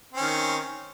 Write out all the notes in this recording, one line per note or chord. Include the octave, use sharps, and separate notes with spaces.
D#3 C4 C#4